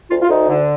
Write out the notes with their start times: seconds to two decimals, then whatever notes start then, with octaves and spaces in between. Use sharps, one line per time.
0.10 D2 F4
0.22 F4
0.29 D2 D#4
0.48 D3